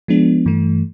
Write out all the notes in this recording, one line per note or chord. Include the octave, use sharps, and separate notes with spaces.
F3 G#3 B3 D4
G2 E3 A3